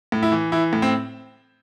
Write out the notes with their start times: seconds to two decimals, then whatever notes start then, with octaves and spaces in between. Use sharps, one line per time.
0.12 A2
0.23 E4
0.32 E3
0.52 E3 E4
0.73 A2
0.82 C4